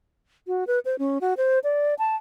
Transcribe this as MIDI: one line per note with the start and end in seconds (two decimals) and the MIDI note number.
0.47 0.64 66
0.67 0.79 71
0.85 0.96 72
0.99 1.18 61
1.21 1.34 66
1.37 1.59 72
1.64 1.94 74
1.99 2.16 81